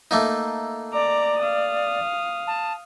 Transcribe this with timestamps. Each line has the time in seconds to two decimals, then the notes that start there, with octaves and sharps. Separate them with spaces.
0.11 A3 A#3 D#4
0.94 D5 A#5 D6
1.39 F5 D#6
2.47 A5